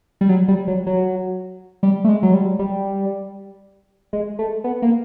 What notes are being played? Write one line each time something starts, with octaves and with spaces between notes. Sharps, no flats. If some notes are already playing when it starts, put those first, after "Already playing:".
G3
F#3
G3
F#3
F#3
G3
A3
G#3
F#3
G3
G3
G#3
A3
B3
A#3